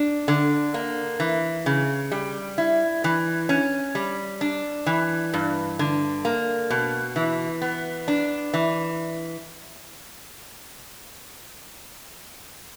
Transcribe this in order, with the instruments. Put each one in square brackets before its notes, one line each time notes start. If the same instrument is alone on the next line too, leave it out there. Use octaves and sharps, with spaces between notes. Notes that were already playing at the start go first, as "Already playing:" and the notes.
Already playing: [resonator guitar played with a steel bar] D4
D3
A#3
E3
C#3
G3
E4
E3
C#4
G3
D4
E3
G2
D3
A#3
B2
E3
B3
D4
E3